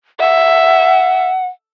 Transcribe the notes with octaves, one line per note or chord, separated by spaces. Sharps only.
E5 F#5